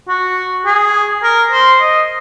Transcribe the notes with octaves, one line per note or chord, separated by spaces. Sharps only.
F#4
G#4
A#4
C5
D#5